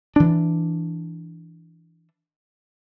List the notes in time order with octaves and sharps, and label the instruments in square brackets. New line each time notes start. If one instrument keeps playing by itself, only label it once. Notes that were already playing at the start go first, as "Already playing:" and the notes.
[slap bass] E3 D4